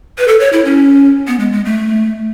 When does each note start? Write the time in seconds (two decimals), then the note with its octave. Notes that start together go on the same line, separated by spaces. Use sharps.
0.18 B4
0.28 A4
0.40 C#5
0.53 E4
0.65 C#4
1.28 B3
1.40 G#3
1.52 G#3
1.65 A3